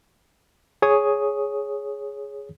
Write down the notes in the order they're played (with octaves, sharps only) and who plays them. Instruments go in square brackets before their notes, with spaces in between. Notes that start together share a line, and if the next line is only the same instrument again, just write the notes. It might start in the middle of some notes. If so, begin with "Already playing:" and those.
[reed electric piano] G#4 C#5 D#6